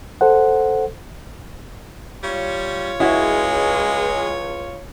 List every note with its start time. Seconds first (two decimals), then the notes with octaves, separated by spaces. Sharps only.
0.21 A4 C5 F#5
2.23 G3 F4 C#5
3.00 C#2 G#3 E4 F#4